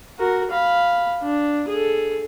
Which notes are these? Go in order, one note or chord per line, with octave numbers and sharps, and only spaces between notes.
F#4 A#4
F5 B5
D4
G#4 A4